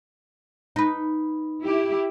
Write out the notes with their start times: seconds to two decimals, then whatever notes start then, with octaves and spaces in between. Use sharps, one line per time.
0.76 D#4 B4
1.62 E4 G4